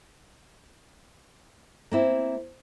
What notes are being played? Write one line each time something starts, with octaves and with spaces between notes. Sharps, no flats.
A#3 C4 E4